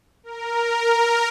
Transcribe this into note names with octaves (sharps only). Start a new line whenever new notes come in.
A#4
A#4